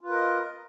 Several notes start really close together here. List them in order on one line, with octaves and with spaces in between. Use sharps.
F4 B4 A#4 D#5